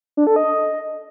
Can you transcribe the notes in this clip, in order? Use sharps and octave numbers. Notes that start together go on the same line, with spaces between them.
D4
A4
D#5